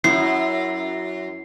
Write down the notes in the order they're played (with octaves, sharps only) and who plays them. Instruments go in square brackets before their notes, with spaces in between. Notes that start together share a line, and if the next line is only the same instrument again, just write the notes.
[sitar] F#2 [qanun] E4 [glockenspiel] C7